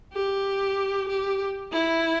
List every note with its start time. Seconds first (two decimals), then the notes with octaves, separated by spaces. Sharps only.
0.13 G4
1.09 G4
1.72 E4